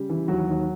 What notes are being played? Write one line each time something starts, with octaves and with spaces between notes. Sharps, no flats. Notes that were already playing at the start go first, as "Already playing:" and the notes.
Already playing: C#3 G3 G4
E3
D#2 F#3 F#4
D#2